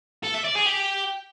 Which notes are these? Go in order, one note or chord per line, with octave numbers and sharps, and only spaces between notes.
A4
E5
D5
G#4
G4